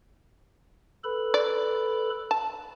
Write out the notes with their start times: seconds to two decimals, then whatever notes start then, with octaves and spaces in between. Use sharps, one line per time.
1.04 A4 B4 B5
1.34 D5
2.31 A5